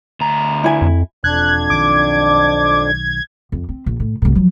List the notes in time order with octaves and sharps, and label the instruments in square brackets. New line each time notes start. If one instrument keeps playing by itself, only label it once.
[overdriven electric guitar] D2 A#5
[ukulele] E4 G#5
[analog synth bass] F2
[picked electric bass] E1 [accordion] F2 D4 [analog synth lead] F#6 [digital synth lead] G#6
[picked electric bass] B1 D#3 [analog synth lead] D6
[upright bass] F2
C4
A#1
A2
C2 A2
F3 F#3